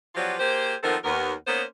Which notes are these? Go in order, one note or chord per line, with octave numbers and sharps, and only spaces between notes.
F3 F#3 B3 F4 G4 D5
A#3 G4 G#4 C5
D#3 F3 B3 C4 A4 A#4
D#2 B3 A#4
A#3 B3 C#4 D#4 B4 C5